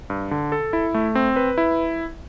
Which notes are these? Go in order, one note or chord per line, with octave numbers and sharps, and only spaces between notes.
G2
D3
A4
E4
A3
C4
B4
E4